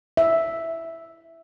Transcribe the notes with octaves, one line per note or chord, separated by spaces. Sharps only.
E5